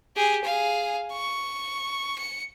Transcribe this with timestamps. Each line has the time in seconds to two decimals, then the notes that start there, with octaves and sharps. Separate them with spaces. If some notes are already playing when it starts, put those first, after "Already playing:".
0.16 G4 G#4
0.44 G#4 F5
1.13 C#6
2.18 C#7